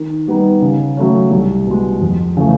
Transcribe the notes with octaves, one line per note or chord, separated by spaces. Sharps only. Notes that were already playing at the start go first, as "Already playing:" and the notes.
Already playing: D#3
G3 B3 D#4
C#3
F#3 A3 C#4
C2
B2 G#3
F2
C#3 E3 A3